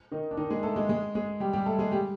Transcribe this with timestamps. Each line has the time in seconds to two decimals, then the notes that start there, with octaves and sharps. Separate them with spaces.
0.12 D#3 D#4
0.31 D4
0.37 D#3 D#4
0.50 G#3 G#4
0.63 A3 A4
0.76 G#3 G#4
0.89 G#3 G#4
1.15 G#3 G#4
1.40 G3 G4
1.53 G3 G4
1.66 A3 A4
1.79 G#3 G#4
1.92 G3 G4